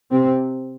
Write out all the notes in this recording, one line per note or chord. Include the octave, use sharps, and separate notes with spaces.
C3 C4